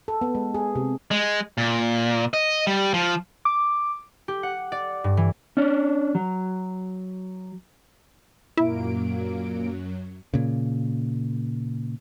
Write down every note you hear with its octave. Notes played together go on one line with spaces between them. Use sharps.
A4
B3
G#3
G#4
C3
G#3
A#2
D#5
G3
F3
D6
G4
F#5
D5
G2
E3
C#4 D4
F#3
F#2 A#2 F#3 A#3 E4 D7
A#2 C#3